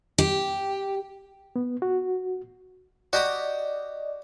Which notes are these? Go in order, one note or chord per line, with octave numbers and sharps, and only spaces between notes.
G4
B3
F#4
F#4 G4 D5 D#5 A#5